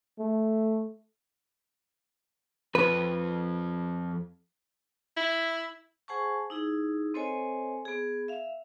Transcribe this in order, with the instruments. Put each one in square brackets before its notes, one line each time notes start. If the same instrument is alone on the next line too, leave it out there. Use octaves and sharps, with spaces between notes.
[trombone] A3
[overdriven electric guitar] F2 [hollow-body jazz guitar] B4
[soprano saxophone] E4
[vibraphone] G#4 C5 F#5 G#5 A5 C#6
D#4 E4 G#4
C4 A4 C5 C#5 D#5 G#5
B3 G#4
E5 F5